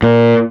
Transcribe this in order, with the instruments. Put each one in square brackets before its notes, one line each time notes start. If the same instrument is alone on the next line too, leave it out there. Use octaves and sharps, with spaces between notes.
[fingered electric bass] A#2